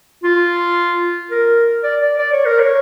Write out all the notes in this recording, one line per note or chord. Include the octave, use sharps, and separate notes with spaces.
F4
A#4
D5
D5
D5
C#5
A#4
C#5